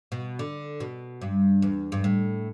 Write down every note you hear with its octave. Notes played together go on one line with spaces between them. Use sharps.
B2
D3
B2
G2
E2
G2
A2